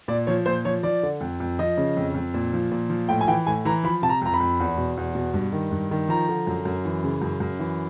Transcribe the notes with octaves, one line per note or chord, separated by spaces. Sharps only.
A#2 D5
F3 C#5
A#2 C5
F3 C#5
F3 D5
D3
F2
F2
F3 D#5
C#3
F2
F2
A#2
F3
A#2
F3
A2 G5
G#5
E3 G5
A2 G#5
E3 A#5
F3 B5
C3 A5
A#5
F2 A#5
B5
F2
E2
B2
E2
B2
G2
D#3
G2
D#3
F3 A#5
D3
F#2
F#2
E3
C#3
F#2
F#2
E3